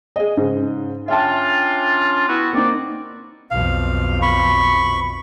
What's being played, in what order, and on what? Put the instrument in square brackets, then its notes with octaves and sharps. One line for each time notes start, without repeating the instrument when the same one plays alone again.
[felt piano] G#4 D#5
G#2 C#3
[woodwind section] C#4 D4 F4 [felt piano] E5 G5 A5
[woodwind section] B3 E4 F#4
[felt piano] A#3 D#4 [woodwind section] C4 D5
[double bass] B1 F2 [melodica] F5
[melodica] B5 C#6